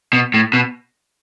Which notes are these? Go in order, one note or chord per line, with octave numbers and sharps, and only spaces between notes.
B2
A2
B2